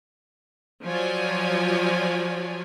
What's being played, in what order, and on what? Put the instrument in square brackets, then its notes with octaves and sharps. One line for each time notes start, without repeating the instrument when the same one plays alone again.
[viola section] F3 F#3 F4 C#5 D5 G#5